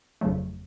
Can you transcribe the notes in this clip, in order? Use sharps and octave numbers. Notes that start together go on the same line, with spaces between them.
G1 F2 C#3 F#3 A3